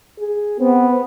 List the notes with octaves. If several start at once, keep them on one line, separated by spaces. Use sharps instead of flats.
G#4
B3 C4